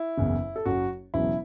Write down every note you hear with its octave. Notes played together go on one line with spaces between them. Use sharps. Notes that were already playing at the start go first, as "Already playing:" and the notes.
Already playing: E4
F#1 E2 C#3
A4
F#1 F#2 F#3 F#4
E1 E2 C#3 F#3 E4